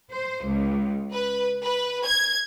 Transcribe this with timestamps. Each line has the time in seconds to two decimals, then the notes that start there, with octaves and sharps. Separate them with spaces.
0.12 C5
0.45 C#2
1.13 B4
1.64 B4
2.05 G#6